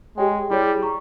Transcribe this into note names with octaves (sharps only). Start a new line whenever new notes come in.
G#3 G4 C#5 G5
G3 E4 G#4 C#5
A#5 C#6